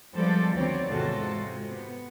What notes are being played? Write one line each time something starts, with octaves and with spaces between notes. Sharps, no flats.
F3 G3 G#3 B3 A4 D5
D2 D#3 B3 C4 C#5 D5
E2 G#2 C3 F4 F#4 A4
C3 G#3
B3